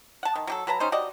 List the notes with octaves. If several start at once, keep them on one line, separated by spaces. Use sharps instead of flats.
F#5 A5
D#3
F#3 G4 A4
F#3 B4 A5 A#5
G3 C#4 D#4 C5
F#4 G4 D5 D#5